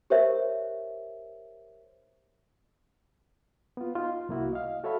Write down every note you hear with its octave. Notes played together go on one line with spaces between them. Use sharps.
G4 A#4 C5 C#5 E5
B3 F4
D#4 F4
C2 A#3 E4 F#4
D#5 F5
F#4 A4 C#5 E5 F5 B5